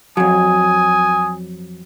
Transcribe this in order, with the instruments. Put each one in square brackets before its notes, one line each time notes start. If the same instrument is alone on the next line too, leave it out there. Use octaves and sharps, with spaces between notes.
[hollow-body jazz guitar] F2 F#3 [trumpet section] G#5 D#6